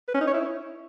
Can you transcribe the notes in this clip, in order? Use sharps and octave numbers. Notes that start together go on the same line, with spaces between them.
B4
C#4
D#4
C#5
E4